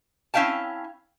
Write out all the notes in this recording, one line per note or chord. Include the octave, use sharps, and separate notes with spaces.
C4 C#4 E4 F5 G5 A5